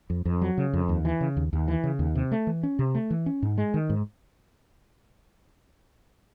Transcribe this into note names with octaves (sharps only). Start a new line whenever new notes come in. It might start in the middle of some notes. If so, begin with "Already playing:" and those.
F2
F2
F#3
C#3
F2
D#2
E3
C#3
D#2
D#2
E3
C#3
D#2
C3
A3
E3
C#4
C3
A3
E3
C#4
G#2
G#3
D#3
G#2